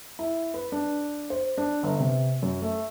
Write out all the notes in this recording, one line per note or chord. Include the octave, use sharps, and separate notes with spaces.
E4
B4
D4
C5
D4
G1
C3
F#2
A3